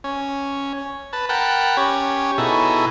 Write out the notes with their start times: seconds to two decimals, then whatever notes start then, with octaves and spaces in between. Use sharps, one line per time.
0.04 C#4
1.13 B4 A5
1.29 A#4 F#5 G5 A5 B5
1.77 C#4 G4 C#5
2.38 B2 D#4 E4 G#4 A4